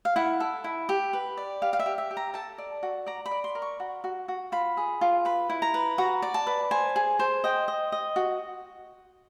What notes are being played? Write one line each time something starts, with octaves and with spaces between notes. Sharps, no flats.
F5
E4 F#5
A4
E4
G4
B4
D5
G4 F5
F5
E5
G4
E5
G4
A#5
A4 A5
D5
F#4
D5 A#5
B5
D5
C6
A#4
C#6
F#4
F#4
F#4
F4 B5
G#4
F4
B4 B5
E4
A#5
B4
F#4 A#5
D5
A5
B4
C5 G#5
G#4
C5
D#5 G5
D#5
D#5
F#4